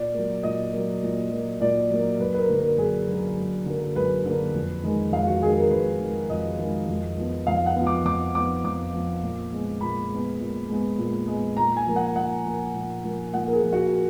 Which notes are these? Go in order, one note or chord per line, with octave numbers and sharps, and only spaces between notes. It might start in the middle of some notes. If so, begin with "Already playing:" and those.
Already playing: A#2 D5
F#3 A#3
A#2 D#5
F#3 A#3
A#2
F#3 A#3
A#2 D5
F#3 A#3
F#2 B4
B4
A#4
D3 F#3 A#3
A#4
F#2 G#4
D3 F#3 A#3
F#2
D3 F#3 A#3
F#2 B4
D3 F#3 A#3
F2
D#3 G#3
F2 F5
F#4
D#3 G#3 G#4
A#4
F2 B4
D#3 G#3
F2 D#5
D#3 G#3
F2
F3 B3
F2 F5
F#5
F3 B3
D6
F2 D6
F3 B3 D6
F2 D6
F3 B3
A#2
G#3 B3
A#2 B5
G#3 B3
A#2
G#3 B3
A#2
G#3 B3
A#2 A#5
G#5
F3 A#3
F#5
A#2 F#5
F3 A#3
A#2
F3 A#3
A#2 F#5
A#4
G#4
F3 A#3
F#4